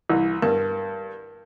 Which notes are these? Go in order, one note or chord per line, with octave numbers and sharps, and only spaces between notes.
C2 E3
G2 A#4